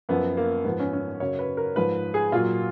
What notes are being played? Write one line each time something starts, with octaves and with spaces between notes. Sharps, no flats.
F#2 F3 B3
A#3
G#2 F3 B3
C#4
C#4
F#2 C#3 F#3 C#5
B4
A#4
G#2 F3 B4
G#4
A#2 F#3 F4